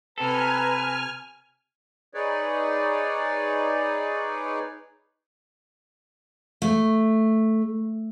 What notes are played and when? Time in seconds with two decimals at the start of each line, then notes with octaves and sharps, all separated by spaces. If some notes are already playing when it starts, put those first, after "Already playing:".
0.18 C3 A4 B4 G#5 A#5 F6
2.14 D#4 G#4 B4 C#5 D5
6.62 A3